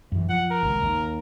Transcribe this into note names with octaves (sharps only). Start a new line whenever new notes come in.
F#2 E3
F3 F#5
A#4
G#1 C#2
D#2